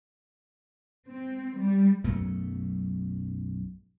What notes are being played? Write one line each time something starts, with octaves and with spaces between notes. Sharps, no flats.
C4
G3
B1 F#2 F#3 A3